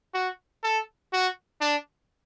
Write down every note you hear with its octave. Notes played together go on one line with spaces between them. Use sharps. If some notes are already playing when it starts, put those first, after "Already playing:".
F#4
A4
F#4
D4